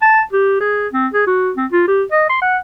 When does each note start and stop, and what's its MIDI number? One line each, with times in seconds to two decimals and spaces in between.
0.02 0.21 81
0.33 0.58 67
0.61 0.88 68
0.93 1.08 60
1.13 1.23 68
1.27 1.52 66
1.57 1.66 60
1.72 1.84 65
1.88 2.03 67
2.12 2.28 75
2.29 2.38 84
2.42 2.58 78